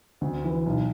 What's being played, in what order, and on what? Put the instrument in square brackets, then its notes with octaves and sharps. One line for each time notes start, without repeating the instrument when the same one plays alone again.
[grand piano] D2
E3
B1